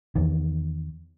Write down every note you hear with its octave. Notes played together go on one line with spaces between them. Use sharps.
E2 D#3